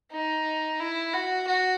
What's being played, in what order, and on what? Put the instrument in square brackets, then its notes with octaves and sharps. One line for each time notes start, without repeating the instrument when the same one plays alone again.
[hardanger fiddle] D#4
E4
F#4
F#4